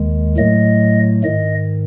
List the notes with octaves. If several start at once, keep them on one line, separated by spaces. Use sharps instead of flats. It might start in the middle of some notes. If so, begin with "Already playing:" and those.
Already playing: D#2 D#3 G#3
A2 F#3 A3 D#5
G#2 D#3 D#5